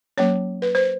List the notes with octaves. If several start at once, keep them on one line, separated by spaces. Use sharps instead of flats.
F#3 A#3 C#4 C#5
B4
C5